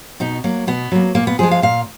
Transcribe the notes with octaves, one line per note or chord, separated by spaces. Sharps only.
B2 D#4
F#3 A#3
B2 B3
F#3 A#3
A#2 A#3
B3
F3 G#3 G#4
F5
A#2 F5